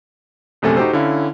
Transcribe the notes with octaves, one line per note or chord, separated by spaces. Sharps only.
A#1 F#2 C3 A3 A4 G#5
D#4 F#4 G4 A4 C5
D3 C#4 E4 F5